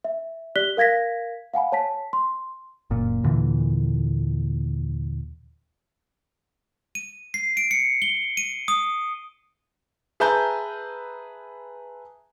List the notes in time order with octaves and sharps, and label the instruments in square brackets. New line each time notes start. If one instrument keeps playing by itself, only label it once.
[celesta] E5
G4 D5 F#6 B6 G7
A#4 F5 G#6 A#6 B6
F5 F#5 G#5 B5
C#5 A5 B6
C6
[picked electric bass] F#1 A#2
D#2 A#2 D3 E3
[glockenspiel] D#7
C7
D7
C#7
G7
D#7
D#6
[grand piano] G#4 B4 E5 A5 A#5 G6